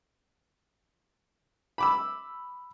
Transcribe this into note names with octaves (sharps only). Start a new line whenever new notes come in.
B5 D6 E6